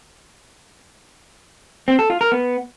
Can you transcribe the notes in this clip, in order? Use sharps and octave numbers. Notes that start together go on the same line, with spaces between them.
C4
A4
F4
A#4
B3